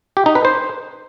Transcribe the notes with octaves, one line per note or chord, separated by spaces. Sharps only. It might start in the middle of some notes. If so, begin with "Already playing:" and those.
G4
D#4
B4
C5